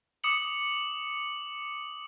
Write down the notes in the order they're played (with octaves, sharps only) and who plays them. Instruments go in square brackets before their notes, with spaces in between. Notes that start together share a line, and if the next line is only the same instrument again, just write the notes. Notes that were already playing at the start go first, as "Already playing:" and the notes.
[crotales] D6 D#6 C#7 F#7